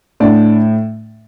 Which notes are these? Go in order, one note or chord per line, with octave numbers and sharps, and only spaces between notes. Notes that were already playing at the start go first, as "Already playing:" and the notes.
A2 D4 D5